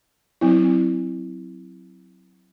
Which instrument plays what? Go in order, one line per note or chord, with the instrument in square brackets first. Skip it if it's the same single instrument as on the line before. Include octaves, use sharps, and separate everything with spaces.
[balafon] F#3 C4 E4